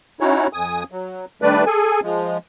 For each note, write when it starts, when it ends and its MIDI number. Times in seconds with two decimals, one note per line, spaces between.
0.20 0.47 61
0.20 0.47 63
0.20 0.47 64
0.20 0.47 66
0.20 0.47 73
0.53 0.83 41
0.53 0.83 80
0.53 0.83 87
0.91 1.25 54
1.42 1.64 51
1.42 1.64 55
1.42 1.64 57
1.42 1.64 62
1.42 1.64 71
1.42 1.64 74
1.66 2.00 68
1.66 2.00 69
1.66 2.00 80
2.03 2.38 53
2.03 2.38 56